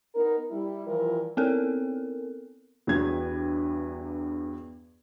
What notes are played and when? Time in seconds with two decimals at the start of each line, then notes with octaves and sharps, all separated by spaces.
0.15 B3 D#4 A#4
0.51 G3 E4
0.86 E3 F3 G3 F4 A#4
1.37 B3 C4 A4 A#4
2.87 E2 G2 F#3 B4 G#6